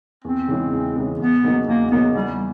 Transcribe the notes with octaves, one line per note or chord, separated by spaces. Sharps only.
E2 C4
C#3 E3 G#3
E2
C#3 E3 G#3
E2 B3
C#3 F#3 A#3 D#4
E2 A#3
C#3 F#3 A#3 B3 D#4
E2 G3